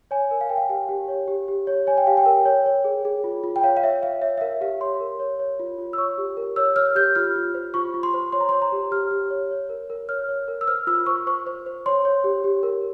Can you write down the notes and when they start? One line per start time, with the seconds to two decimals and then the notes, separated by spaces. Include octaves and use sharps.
0.11 C#5 G#5
0.31 A#4
0.41 F5
0.49 A#4 G5
0.58 F5
0.69 G4 F5
0.89 G4
1.08 C#5
1.28 G4
1.48 G4
1.67 C#5
1.87 C#5 G#5
1.98 G5
2.07 G4 F5
2.17 G5
2.26 A#4
2.45 C#5
2.66 C#5
2.84 G#4
3.05 G#4
3.24 F4
3.44 F4
3.56 G5
3.64 C#5 F5
3.77 F5
3.83 C#5 E5
4.02 C#5 F5
4.21 C#5 E5
4.38 E5
4.41 A#4 F5
4.61 G4 F5
4.81 C#5 C6
5.01 A#4
5.19 C#5
5.40 C#5
5.60 F4
5.79 F4
5.93 E6
5.98 C#5 C#6
6.18 G4
6.37 A#4
6.56 C#5 E6
6.76 C#5 F6
6.95 G4 G6
7.15 F4 F6
7.36 F4
7.55 C5
7.74 F4 C#6
7.94 F4
8.03 C6
8.14 C5
8.32 C#5 C6
8.41 A#5
8.49 C#5 C6
8.62 A#5
8.72 G4
8.91 G4 F6
9.11 G4
9.30 C#5
9.51 C#5
9.69 A#4
9.90 A#4
10.09 C#5 F6
10.28 C#5
10.48 A#4
10.61 E6
10.68 C5 F6
10.87 F4 E6
11.06 C5 C#6
11.27 C5 C#6
11.47 C5
11.66 C5
11.86 C#5 C6
12.05 C#5
12.24 G4
12.44 G4
12.63 A#4